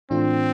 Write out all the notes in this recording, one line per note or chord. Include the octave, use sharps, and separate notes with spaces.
A2 E3 A3 C4 D4 F4